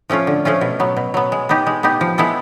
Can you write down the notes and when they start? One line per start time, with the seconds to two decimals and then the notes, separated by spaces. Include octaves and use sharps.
0.10 F3 A3 C#4 F4
0.27 D3
0.45 F3 A3 C#4 F4
0.61 B2
0.80 F#3 B3
0.97 B2
1.14 F#3 B3
1.32 G#3
1.49 B3 D#4 G4
1.67 G#3
1.83 B3 D#4 G4
2.01 F3
2.18 G#3 B3 E4 A4